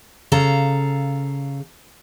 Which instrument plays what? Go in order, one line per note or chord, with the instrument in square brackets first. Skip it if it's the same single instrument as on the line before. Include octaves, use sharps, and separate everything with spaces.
[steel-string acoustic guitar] C#3 A4 F5 A#5